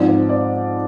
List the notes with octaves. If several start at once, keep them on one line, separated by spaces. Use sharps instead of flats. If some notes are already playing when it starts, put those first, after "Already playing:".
Already playing: G#2 F3 C4 D5
C5
D5